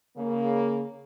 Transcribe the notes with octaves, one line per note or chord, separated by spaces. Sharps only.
C#3 A#3